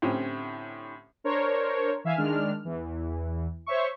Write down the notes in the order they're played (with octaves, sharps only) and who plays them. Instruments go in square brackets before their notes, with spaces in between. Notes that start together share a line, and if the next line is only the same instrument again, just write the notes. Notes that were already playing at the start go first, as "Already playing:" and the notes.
[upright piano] A2 D3 C4 C#4 G4
[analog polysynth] D4 A#4 C5 C#5
E3 E5 F5 G#5 E7
D#3 G#3 D4 F6
E2 E3
C5 C#5 E5 C#6